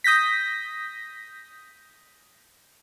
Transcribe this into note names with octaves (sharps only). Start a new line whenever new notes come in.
D#6 G6 A#6 B6